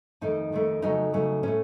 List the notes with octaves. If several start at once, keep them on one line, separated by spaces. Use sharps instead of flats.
F2 D#3 A3 D#4
F2 D#3 A3
F2 C#3 F#3 A3 D#4
F2 C#3 F#3 A3
A2 A3 C#4